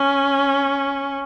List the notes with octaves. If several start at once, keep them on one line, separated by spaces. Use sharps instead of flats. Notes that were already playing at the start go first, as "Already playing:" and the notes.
Already playing: C#4